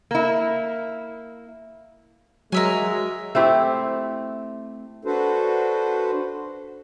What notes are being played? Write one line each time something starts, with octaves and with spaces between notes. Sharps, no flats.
A#3 E4
F#3 G#3 A#4 E5 G#5
A3 C4 E4 G4
D4 F#4 A4 B4 C5